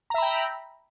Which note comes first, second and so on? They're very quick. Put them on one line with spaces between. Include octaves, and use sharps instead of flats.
A#5 E5 B5 G5